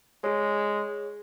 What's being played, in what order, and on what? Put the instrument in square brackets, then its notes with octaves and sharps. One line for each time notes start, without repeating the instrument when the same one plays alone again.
[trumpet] G#3 [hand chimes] G#4 C#5